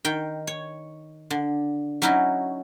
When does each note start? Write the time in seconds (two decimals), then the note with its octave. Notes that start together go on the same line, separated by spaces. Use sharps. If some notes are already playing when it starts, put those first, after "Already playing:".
0.05 D#3 G5
0.47 C#5
1.30 D3
2.02 F#3 C#4 D#4 E4 F#4